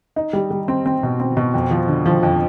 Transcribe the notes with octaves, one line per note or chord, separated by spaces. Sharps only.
D#4
G3
G3
C4
C4
B2
C4
B2
F2
F3
D3
F3
F2